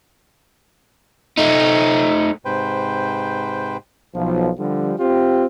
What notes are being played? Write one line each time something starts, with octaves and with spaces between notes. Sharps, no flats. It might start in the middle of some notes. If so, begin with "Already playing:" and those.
A3 D#4
G#2 C3 B4 C5 G5
B1 F3
D3 F3 G3
C4 F4 G4